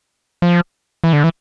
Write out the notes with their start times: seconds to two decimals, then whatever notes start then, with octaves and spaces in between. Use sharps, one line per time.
0.42 F3
1.04 E3
1.13 D3
1.24 E3